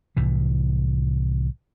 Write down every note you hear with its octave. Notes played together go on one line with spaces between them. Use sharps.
C2 A2 E3